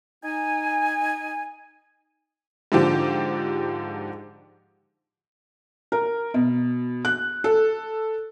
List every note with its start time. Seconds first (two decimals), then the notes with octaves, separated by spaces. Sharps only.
0.24 D#4 G#5
2.72 G#2 D3 F3 G4
5.92 A#4
6.34 B2
7.05 F#6
7.44 A4